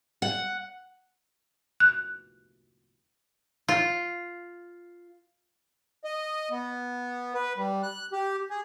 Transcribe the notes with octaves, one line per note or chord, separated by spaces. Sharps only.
F#5
F#6
F4
D#5
B3
B4
G3
F#6
G4
G#4